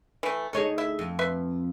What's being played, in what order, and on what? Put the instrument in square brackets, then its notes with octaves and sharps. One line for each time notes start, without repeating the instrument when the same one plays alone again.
[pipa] E3 A3
[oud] D2 D#4 G#4 [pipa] A4 C#5
[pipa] E4 E5
[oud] F2
[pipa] B4 E5 C6